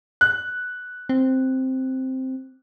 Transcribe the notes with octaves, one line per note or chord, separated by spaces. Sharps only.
F#6
C4